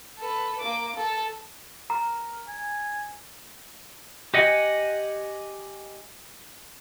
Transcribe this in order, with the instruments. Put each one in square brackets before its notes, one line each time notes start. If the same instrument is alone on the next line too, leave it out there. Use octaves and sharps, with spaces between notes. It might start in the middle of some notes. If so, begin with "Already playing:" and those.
[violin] A4 B4
A#3 D6
A4
[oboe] A#4 [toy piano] A#5
[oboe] G#5
[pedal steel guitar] G4 D#5 F#5 G#5